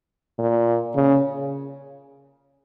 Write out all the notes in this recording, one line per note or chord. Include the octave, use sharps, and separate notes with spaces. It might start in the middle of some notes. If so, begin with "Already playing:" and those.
A#2
C#3